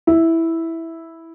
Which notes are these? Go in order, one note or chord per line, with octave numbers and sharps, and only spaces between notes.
E4